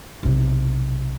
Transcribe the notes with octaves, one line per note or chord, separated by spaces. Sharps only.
B1 C3